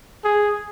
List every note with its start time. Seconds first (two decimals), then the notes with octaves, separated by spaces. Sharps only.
0.24 G#4